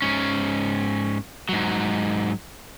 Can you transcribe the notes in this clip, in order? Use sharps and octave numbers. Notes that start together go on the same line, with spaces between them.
G#2 C#4
G#2 F#3